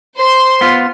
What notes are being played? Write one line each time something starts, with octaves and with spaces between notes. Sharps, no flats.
C5 C6
B3 F4